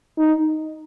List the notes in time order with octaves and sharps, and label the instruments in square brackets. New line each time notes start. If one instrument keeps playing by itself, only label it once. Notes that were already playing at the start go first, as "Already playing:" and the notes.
[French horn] D#4